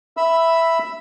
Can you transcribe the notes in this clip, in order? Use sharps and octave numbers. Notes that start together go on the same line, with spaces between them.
E5 B5 E6